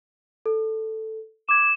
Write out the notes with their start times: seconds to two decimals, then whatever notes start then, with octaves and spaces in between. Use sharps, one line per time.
0.46 A4
1.49 D6 G#6 E7